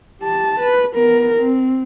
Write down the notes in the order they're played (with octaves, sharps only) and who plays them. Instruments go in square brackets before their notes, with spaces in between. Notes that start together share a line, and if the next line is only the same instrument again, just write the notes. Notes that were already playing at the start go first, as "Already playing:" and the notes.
[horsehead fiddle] G4 A5
B4
B3 A#4
C4